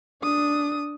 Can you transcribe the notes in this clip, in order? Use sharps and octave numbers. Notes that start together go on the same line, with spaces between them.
D4 D#6